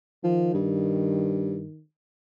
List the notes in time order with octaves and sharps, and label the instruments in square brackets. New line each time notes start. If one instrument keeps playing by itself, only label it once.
[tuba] D#3 [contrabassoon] F3
[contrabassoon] G2